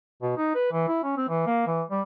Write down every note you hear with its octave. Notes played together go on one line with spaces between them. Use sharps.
B2
D#4
B4
E3
E4
C#4
C4
E3
A#3
E3
G3